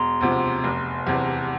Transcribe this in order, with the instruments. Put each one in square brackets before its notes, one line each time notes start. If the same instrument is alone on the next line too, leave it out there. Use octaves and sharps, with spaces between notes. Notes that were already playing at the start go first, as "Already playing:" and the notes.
Already playing: [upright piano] E1 [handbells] A#5 C6
[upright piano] D2 C3 F3
F1
E2 C3